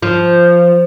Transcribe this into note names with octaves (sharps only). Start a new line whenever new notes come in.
F3